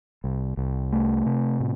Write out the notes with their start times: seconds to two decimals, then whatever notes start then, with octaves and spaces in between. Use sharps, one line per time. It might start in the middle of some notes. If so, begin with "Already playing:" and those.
0.24 C2
0.57 C2
0.93 A3
1.26 C3
1.60 A2